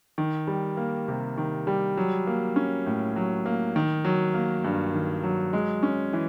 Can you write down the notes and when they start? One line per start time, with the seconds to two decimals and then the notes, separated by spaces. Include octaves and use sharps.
0.18 D#3
0.47 G3
0.77 A#3
1.08 C3
1.38 D#3
1.67 G3
1.97 F#3
2.27 A#3
2.56 C#4
2.86 A2
3.16 F#3
3.46 A#3
3.76 D#3
4.05 F#3
4.34 A#3
4.64 G2
4.94 D#3
5.24 F#3
5.53 G#3
5.83 C#4
6.13 E3